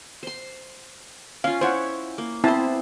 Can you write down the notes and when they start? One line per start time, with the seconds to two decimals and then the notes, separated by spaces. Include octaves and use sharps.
0.23 C5 C6
1.44 C#4 F4 F5
1.61 E4 C5 C#5 F#5
2.18 A#3
2.44 B3 C4 E4 C5 A5